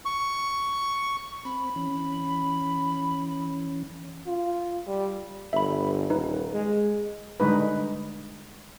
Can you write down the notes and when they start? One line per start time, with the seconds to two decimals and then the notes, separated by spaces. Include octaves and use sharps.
0.05 C#6
1.45 C4 B5
1.76 E3 C#4
4.27 F4
4.87 G3
5.53 G1 E5 B5
6.10 D#1 D#4 B4
6.53 G#3
7.40 D3 G3 G#3 D#4 B4